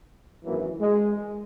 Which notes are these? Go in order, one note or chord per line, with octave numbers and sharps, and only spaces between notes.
G#1 F#2 E3 F#3 A#3
G#3